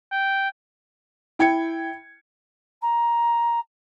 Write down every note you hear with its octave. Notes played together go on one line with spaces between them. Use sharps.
G5
E4 G5 G#6 C#7
A#5